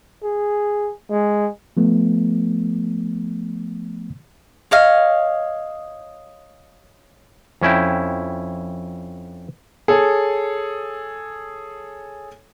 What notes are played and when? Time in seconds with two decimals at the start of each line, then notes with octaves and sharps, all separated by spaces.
0.24 G#4
1.11 G#3
1.77 F3 A3 B3
4.71 C#5 D#5 F5
7.62 F2 C#4 E4 G5
9.88 G#4 A4 C#5